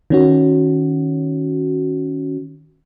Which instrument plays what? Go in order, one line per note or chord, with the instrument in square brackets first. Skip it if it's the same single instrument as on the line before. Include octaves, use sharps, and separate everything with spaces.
[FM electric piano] D#3 C#4 F#4